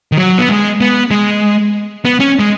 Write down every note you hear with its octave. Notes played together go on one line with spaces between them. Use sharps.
D#3
F#3
B3
G#3
B3
G#3
B3
C#4
G#3